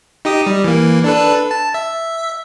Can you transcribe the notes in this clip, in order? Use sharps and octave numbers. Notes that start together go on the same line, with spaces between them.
D#4 G4 D#6
G3
E3 A#3
D4 A4 B4
A5
E5